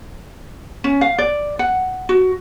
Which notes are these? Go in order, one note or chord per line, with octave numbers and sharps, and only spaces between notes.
C#4
F5
D5
F#5
F#4